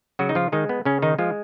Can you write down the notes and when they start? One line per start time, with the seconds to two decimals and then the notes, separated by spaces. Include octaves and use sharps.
0.19 C#3 F#3 F#4
0.29 D#4
0.35 F3 F4
0.52 D#3 G#3 D#4
0.69 B3
0.85 C#3 C#4
1.02 D#3 D#4
1.18 F3 G#3 F4